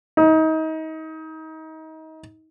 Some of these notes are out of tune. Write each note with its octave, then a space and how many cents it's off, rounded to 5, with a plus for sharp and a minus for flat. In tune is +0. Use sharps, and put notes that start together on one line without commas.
D#4 +30